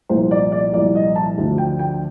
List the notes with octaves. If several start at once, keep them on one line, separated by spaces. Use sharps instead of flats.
C2 A#2 F3 C5
D5
D5
C2 A#2 F3 D5
D#5
A5
D2 D3 F3
G5
G5